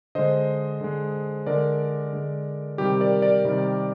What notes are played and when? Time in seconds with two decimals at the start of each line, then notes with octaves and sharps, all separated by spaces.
0.15 D3 G#3 C5 D#5
0.81 D3 G#3
1.46 D3 G#3 A#4 D5
2.13 D3 G#3
2.78 C3 D#3 G3 G4
3.01 A#4 D5
3.22 A#4 D5
3.45 C3 D#3 G3